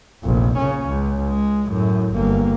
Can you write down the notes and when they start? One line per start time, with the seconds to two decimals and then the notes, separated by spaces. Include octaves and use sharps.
0.24 F1 A#1
0.58 C#3 C#4
0.89 C#2
1.29 G#3
1.67 F#2 A2
2.14 G1 A#3